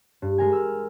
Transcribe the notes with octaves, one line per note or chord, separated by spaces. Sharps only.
G2
G#3 A#4 G#5
E6 F6